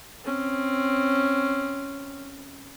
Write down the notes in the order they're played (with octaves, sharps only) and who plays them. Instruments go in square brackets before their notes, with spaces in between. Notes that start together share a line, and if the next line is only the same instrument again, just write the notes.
[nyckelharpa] C4 C#4